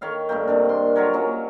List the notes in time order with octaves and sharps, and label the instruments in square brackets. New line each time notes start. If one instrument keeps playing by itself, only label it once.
[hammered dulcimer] D#3 C#5 F5 G5
G2 A3 A#3 G5
C3 D#3 D4
A#3 C6
F#3 F4 A#4 C#5
F#3 A#3 C#4